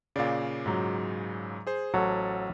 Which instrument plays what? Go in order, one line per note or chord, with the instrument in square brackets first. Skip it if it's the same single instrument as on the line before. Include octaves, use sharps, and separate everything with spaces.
[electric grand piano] A#2 C#3 [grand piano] D5 F5
[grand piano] G#2 F#3
[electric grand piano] G#4 C5
[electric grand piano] A1 [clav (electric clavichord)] F#3 [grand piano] A4 C5